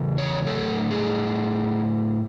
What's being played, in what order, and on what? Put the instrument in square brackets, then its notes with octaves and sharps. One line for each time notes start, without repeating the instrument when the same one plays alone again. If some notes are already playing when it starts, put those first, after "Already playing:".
Already playing: [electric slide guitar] E2 C#3
C#5
A2 F#3 A3 A4
G#4